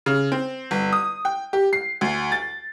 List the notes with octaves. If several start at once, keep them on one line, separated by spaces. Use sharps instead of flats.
C#3
C4
G1
D#6
G5
G4
C7
D2
A6